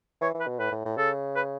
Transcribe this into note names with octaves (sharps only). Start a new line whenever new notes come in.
E3 C#5
E3
B4
B2
A2 B4
A2
A2
C#3 A4
B4